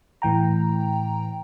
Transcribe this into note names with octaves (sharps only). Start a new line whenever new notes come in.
A2 E3 G5 A#5